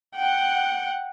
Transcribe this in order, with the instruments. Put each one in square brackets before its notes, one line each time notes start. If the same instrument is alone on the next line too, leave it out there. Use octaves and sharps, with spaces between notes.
[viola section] F#5 [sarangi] G5